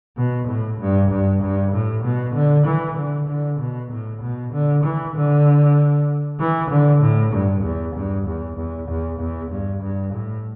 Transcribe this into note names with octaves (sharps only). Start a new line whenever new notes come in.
B2
A2
G2
G2
G2
A2
B2
D3
E3
D3
D3
B2
A2
B2
D3
E3
D3
E3
D3
A2
G2
E2
G2
E2
E2
E2
E2
G2
G2
A2